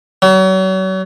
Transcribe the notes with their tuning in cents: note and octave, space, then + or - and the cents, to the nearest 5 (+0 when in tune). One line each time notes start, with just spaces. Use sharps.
F#3 +35